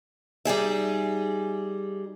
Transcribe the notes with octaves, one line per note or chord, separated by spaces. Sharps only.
G3 D#4 G#4 E5